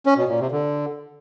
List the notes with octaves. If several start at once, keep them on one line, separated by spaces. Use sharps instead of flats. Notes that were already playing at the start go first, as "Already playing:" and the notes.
C#4
B2
A#2
C3
D3